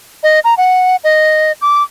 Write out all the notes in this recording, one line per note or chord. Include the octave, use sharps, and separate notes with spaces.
D#5
A#5
F#5
D#5
D6